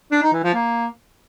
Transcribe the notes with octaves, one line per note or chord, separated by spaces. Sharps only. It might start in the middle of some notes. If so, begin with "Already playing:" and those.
D4
D#4
E3
F3
A#3